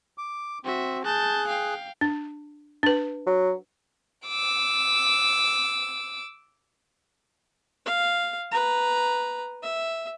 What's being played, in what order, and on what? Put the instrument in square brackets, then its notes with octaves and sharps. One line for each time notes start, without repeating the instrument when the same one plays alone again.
[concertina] D6
[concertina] C4 [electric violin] F#4 E5
[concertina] G#4 F#6 [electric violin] A5 G6
[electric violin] F5 G5
[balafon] D4
D4 B4
[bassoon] F#3
[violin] D6 E6
[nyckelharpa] F5
B4 A#5
E5